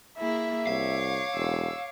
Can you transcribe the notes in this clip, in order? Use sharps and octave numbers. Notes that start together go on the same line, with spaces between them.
A#3 E4 G#4 E5
C2 C#5 F5 D6
E1 E6